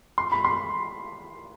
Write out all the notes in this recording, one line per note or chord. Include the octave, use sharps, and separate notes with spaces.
C6
B5
C6